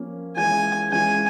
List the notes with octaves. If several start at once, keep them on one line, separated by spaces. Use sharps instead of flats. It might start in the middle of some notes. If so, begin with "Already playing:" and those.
Already playing: F3 A#3 C#4 F4
E3 G#3 C#4 F4 G#5
E3 G#3 C#4 F4 G#5